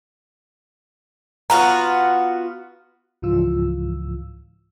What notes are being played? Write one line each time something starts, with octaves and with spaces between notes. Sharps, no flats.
B3 F4 F#4 A#5
C#2 G#2 E3 F3 F4 E6